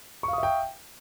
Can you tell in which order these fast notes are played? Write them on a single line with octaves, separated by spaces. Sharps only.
C#6 F5 D#6 E5 G5